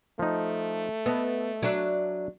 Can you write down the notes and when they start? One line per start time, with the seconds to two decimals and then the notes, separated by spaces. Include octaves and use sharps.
0.19 F3 A3 D#4
1.06 B3 A4 D#5 A5
1.62 F#3 D4 E5